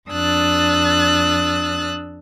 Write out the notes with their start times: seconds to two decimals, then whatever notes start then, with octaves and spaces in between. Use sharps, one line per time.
0.10 F2 D4 D#6 E6 F#6 A6